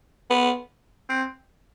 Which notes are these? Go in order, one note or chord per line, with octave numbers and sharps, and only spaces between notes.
B3
C4